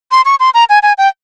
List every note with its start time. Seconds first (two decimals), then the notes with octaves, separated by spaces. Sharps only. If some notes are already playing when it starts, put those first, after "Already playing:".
0.11 C6
0.25 C#6
0.40 C6
0.54 A#5
0.69 G#5
0.83 G#5
0.98 G5